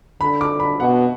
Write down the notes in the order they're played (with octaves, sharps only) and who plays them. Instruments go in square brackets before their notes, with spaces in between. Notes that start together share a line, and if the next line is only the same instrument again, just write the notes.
[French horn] D3 [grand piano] B5
[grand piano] D6
B5
[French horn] B2 [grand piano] F#5